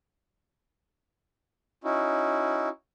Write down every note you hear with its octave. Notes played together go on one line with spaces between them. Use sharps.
C#4 D#4 E4 F#4